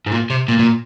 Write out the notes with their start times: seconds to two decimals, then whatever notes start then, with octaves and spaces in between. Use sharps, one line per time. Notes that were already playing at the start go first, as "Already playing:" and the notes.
0.07 G#2
0.12 A#2
0.30 C3
0.48 A#2
0.59 A#2